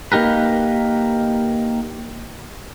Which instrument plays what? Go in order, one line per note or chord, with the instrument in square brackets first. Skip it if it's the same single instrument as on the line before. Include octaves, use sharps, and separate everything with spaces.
[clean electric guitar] A#3 D#4 G4 A#4 B4